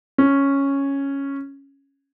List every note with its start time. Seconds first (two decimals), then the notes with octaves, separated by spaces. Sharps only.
0.18 C#4